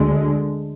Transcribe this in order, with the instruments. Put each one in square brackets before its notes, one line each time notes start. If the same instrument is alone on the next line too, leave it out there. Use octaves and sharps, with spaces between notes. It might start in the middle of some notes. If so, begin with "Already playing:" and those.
Already playing: [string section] D2 D3 G#3